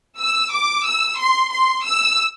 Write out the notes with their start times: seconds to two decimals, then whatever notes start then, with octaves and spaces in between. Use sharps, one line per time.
0.18 E6
0.51 D6
0.85 E6
1.19 C6
1.52 C6
1.85 E6